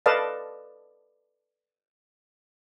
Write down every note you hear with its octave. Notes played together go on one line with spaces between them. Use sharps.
A4 B4 D5 D#5 F5 A5